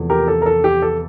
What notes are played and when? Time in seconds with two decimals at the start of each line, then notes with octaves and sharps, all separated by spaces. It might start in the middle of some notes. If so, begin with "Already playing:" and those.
Already playing: E2 C3 F3 A3
0.10 G4 A#4
0.28 A4
0.42 A#4
0.46 A4
0.64 G4
0.82 A4